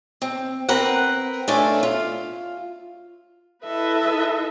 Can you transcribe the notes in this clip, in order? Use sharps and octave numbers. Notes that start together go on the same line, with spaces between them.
C4
C4 A#4 B4 F#5
A3 C#4 D4 F4 A4 E5
F4
E4 A4 B4 D#5 E5